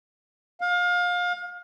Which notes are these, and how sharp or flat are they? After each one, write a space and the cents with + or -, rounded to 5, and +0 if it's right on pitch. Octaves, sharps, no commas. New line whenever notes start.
F5 +30